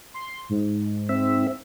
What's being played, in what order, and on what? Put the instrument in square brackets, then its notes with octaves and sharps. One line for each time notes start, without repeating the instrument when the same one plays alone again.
[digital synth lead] C6
G#2
[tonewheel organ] C4 E5